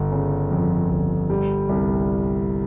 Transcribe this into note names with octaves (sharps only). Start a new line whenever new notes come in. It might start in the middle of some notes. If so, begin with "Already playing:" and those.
Already playing: G1
C#3
F2
G1
G3
C2